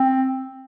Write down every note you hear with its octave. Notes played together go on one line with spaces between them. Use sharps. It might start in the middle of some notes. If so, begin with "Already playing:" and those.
Already playing: C4